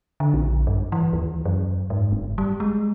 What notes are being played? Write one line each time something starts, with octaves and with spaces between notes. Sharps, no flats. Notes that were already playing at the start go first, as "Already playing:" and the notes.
D3
A#1
G2
E3
D#2
F#2
G#2
F#1
G3
G#3